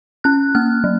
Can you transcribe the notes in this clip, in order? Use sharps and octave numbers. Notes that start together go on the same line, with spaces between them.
C#4 F#6
A#3 F6
F#3